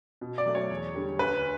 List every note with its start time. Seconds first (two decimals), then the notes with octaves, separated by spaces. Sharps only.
0.21 B2
0.38 D5
0.45 F#3 A3
0.55 C#5
0.71 E2
0.95 D3 G3
1.19 D2 B4